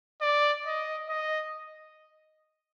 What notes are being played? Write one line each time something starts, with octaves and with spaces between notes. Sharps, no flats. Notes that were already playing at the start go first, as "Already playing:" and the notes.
D5
D#5
D#5